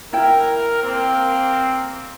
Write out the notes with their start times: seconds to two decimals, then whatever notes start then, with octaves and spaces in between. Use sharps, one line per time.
0.13 E4 A#4 G5
0.83 A#3 C4